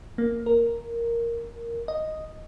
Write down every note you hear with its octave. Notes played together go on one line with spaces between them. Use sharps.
A#3
A#4
D#5